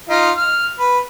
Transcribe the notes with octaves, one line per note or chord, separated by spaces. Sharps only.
D#4 F4
F6
B4